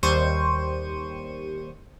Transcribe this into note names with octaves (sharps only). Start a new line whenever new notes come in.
D#2 G3 C5 C#6 D#7